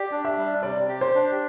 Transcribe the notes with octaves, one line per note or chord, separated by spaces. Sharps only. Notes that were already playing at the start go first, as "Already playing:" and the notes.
Already playing: G4 D5
D4
E5
G3
C3 D5
G4
C5
D4